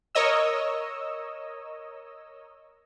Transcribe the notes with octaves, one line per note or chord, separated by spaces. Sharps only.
A#4 C#5 D#5 E6